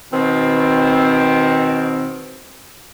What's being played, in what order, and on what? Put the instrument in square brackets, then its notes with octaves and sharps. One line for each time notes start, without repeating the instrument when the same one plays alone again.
[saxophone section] B2 D#3 C4